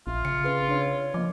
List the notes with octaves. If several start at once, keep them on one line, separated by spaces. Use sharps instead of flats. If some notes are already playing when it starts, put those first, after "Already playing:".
A#1 F4 E5
C#3 C#7
C#4 G#4 B4 C#7
D4 C#5
F3 A#3 D#5 D6